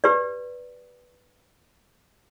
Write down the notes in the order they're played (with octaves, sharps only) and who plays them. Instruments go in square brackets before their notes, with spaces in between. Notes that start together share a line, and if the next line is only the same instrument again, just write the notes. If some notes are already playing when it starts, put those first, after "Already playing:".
[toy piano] G4 B4 D5